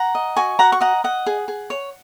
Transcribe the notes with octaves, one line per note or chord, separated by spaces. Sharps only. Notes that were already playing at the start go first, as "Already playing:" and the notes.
Already playing: F#5 A#5
D#5
F#4 G#5 C#6
F#4 F#5 A#5
C#6
D#5 F#5 A#5
D#5 F#5
G#4
G#4
C#5